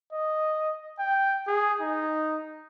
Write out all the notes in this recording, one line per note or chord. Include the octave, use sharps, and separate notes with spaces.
D#5
G5
G#4
D#4